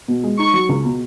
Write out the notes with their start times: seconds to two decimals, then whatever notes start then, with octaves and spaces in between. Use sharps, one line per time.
0.08 B2
0.24 G#3
0.39 D#4 C#6
0.54 F#3
0.69 C#2
0.84 B2